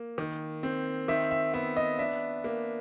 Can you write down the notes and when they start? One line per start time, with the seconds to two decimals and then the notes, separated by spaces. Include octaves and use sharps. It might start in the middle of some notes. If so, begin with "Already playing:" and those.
Already playing: A#3
0.18 D#3
0.63 C4
1.08 D#3 E5
1.31 E5
1.54 B3 E5
1.77 D#5
1.99 D4 E5
2.44 A#3